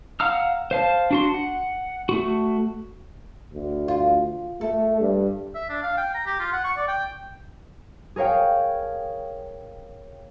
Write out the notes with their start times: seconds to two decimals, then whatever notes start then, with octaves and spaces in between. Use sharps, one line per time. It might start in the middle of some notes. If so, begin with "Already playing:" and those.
0.20 F5 F#5 A#5 E6 F6
0.71 C5 F5 A5
1.11 D4 F#4 C6
1.34 F#5
2.09 A3 F#4
3.53 D2
3.88 F4
4.61 A3 A4
5.00 G2
5.55 E5
5.69 D4
5.83 F5
5.97 G5
6.15 A#5
6.26 G4
6.40 F4
6.53 F#5
6.64 C#6
6.77 D5
6.88 G5
8.16 G#4 A#4 C#5 F5 G5